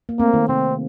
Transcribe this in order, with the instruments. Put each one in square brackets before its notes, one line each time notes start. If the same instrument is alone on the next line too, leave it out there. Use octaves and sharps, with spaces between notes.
[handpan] A#3
[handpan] A3 C4 [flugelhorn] A#3
[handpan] D#3
[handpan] C3 [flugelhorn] C4